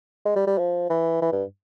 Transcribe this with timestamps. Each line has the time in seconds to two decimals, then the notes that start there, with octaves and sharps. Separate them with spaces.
0.25 G#3
0.36 G3
0.47 G3
0.58 F3
0.90 E3
1.22 E3
1.32 G2